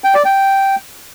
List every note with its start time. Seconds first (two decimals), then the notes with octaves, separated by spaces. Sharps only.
0.04 G5
0.14 D5
0.25 G5